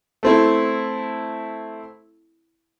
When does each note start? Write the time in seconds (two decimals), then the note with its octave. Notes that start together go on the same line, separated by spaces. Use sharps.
0.23 A3 C4 E4